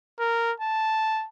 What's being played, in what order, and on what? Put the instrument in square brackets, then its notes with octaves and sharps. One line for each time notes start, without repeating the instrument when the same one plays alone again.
[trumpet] A#4
A5